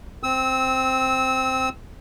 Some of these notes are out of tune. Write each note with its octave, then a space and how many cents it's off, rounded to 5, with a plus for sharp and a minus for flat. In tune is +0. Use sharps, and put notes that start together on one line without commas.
C4 +0 E6 -30